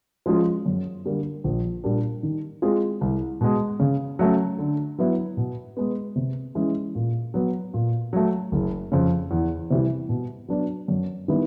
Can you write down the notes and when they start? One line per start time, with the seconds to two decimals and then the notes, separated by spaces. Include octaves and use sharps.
0.26 F3 G#3 C#4 F4
0.66 F#2
1.05 D3 G3 A#3
1.44 A#1
1.84 A#2 G3 A#3 D4
2.23 D#3
2.62 G#3 C4 F4 G#4
3.01 C2
3.41 B2 G#3
3.79 C#3
4.19 F#3 A3 C#4
4.58 D3
4.99 F#3 B3 E4
5.37 B2
5.77 G#3 B3
6.16 C3
6.55 E3 G#3 C#4
6.95 A#2
7.34 F#3 B3
7.74 A#2
8.13 F#3 A3
8.52 F#1
8.92 F2 C#3
9.31 E2
9.70 C3 E3 G3
10.09 B2
10.48 F#3 B3 D4 F#4
10.88 F#2
11.28 D#3 G3 B3 E4